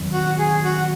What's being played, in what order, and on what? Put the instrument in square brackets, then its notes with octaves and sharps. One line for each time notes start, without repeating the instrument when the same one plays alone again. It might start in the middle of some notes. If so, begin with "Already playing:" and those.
Already playing: [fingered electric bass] E2 D#3 F#3
[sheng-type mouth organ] F#4
G#4
F#4